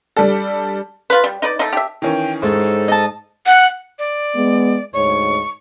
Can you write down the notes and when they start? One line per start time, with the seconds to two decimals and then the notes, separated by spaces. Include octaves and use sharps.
0.17 G3 D4 A4
1.10 F4 B4
1.24 G3
1.42 D#4 B4 D5
1.59 A3 D#4
1.73 G4 E5
2.02 D#3 E3 C#4 G5
2.42 G#2 A4
2.88 D#5 A5
3.46 F#5
3.99 D5
4.35 G#3 B3
4.94 D2 G#2 C#5 C#6